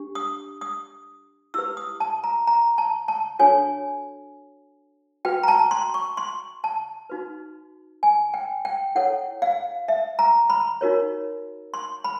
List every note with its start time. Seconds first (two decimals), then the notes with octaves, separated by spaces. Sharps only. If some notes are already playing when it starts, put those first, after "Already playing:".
Already playing: D4 G4
0.15 D#6
0.61 D#6
1.54 E4 G4 B4 E6
1.77 D#6
2.00 A5
2.24 A#5
2.47 A#5
2.78 A5
3.08 A5
3.39 D4 F#4 A4 C#5 G#5
5.25 F#4 B4 G5
5.43 A#5
5.48 A5
5.71 C6
5.94 C#6
6.17 C6
6.64 A5
7.10 D#4 F#4 B4
8.03 G#5
8.34 G5
8.65 G5
8.95 E4 A4 C#5 F#5
9.42 F5
9.88 E5
10.19 A#5
10.50 B5
10.81 D#4 F#4 A#4 C#5
11.74 C6
12.04 B5